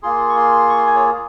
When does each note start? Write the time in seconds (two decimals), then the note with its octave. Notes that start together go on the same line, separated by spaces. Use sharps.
0.02 A#3 F4 G#4 C6
0.29 C#6
0.36 C6
0.69 C#6
0.78 C6
0.87 G#5
0.96 C#5